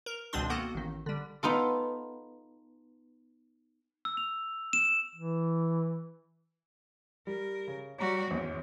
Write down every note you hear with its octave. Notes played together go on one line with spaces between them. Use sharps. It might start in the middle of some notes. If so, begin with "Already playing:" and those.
A#4
G#1 C#2 B2 C4 D4 C6
A#3 B3 F#4 A4
A1 D#3
D3 G3
B3 D#4 F4 A4
E6
F7
E7
E3
G3 A#4
C#3
G3 F#4 C#5 A#5 C#6
G#1 E2 C#4